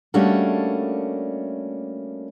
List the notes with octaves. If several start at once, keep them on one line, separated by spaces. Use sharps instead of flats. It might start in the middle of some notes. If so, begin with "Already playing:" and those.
G3 A3 A#3 C#4 D4 F#4